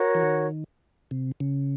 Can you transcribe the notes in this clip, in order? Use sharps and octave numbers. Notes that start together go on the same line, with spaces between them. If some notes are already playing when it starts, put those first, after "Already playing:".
Already playing: F#4 A#4 C#5 F#5
E3
D#3
C3
C#3